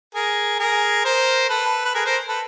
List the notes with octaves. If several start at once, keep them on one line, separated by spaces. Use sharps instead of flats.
G#4 A#4
G#4 A#4
A#4 C5
A4 B4
B4
G#4 A#4
A#4 C5
A4 B4